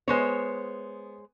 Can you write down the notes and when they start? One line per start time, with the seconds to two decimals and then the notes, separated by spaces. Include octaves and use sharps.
0.08 G#3 B3 C5 C#5